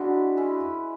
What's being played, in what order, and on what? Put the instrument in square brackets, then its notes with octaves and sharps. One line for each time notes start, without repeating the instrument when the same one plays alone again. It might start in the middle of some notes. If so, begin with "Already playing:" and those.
Already playing: [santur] G#3 C#4 E4 B4 [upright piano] D4 F#4
[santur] G#3 C#4 E4 B4